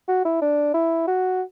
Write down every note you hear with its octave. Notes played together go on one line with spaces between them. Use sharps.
F#4
E4
D4
E4
F#4